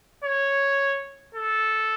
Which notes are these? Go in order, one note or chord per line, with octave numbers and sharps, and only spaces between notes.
C#5
A4